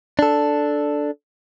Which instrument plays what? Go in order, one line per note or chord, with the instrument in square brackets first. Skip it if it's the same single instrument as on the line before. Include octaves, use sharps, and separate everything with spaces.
[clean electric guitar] D4 A4